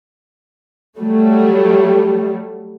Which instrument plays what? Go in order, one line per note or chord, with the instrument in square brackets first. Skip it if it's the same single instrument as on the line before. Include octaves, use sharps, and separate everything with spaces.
[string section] F#3 G3 A3